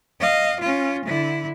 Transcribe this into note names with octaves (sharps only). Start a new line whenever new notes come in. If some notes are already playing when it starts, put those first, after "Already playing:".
D#5 F5
C#4 F4
D3 E4